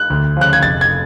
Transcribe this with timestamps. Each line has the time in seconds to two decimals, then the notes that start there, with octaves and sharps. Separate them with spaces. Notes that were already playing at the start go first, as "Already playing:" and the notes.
Already playing: F#6
0.10 D2
0.37 C#3 F3 F#6
0.53 G#6
0.63 F1 A6
0.81 G#6